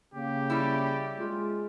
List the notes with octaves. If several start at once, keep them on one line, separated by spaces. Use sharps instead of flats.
C#3 A#3 G4
G3 E4
G#3 F4